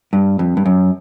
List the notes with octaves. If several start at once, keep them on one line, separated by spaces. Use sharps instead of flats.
G2
F2
G2
F#2